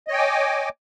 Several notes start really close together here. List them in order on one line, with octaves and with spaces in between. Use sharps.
D#5 C#5 G5 G#5 D6